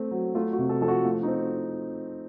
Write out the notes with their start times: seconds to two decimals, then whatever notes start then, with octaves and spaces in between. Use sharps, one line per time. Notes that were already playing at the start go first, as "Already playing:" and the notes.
Already playing: A3 C4
0.11 F#3
0.35 A3 F4
0.53 F#4
0.59 C3
0.69 A4
0.81 F3 A4
0.88 F#4
1.05 A3 F4
1.23 D#4
1.28 C4